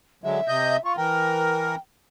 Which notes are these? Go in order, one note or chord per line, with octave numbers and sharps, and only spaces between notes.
D3 F#3 G#3 E5
C3 D#5 G6
F4 C#6
E3 A#4 G5